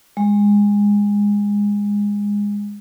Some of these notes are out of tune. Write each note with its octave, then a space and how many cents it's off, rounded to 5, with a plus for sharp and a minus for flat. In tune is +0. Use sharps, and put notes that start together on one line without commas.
G#3 -20